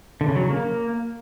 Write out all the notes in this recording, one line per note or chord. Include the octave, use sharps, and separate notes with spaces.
D3
C#3
F#3
C#3
A#3